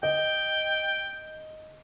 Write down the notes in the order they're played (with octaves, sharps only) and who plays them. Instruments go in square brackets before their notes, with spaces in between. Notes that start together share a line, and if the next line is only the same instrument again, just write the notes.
[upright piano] D#5 [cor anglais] G5